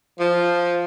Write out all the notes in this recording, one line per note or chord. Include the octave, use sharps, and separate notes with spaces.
F3